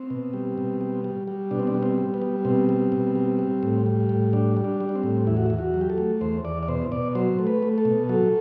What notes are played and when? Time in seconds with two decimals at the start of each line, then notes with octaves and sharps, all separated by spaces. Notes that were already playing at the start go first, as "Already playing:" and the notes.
Already playing: C4
0.10 B2
0.33 G3
0.58 B2
0.81 G3
1.04 G3
1.28 G3
1.51 B2 D4
1.60 C4
1.67 D4
1.74 G3
1.83 C4
1.98 G3
2.14 B3
2.22 G3
2.45 B2 C4
2.69 G3
2.92 B2
3.15 G3
3.39 G3
3.63 A2
3.86 G3
4.09 A2
4.33 G3 D4
4.57 G3
4.64 D4
4.80 G3
4.89 D4
4.95 C4
5.03 A2
5.27 E2 E4
5.37 F#4
5.46 E4
5.50 E2
5.59 F#4
5.74 F#3
5.81 G4
5.90 A4
5.98 A3
6.21 E2 C5
6.45 E2 D5
6.63 D5
6.68 B2 C5
6.91 B2 D5
7.15 F#3 C5
7.39 A3
7.47 B4
7.62 A3
7.78 A4
7.85 B2
8.09 F#3 A4